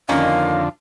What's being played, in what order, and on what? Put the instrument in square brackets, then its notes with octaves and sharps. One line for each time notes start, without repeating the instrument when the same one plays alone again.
[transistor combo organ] F2 D3 [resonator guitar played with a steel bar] D#3 A#3 C#4 [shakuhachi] F5